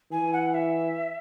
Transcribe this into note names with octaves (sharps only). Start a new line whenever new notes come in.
E3 G#5
F#5
E5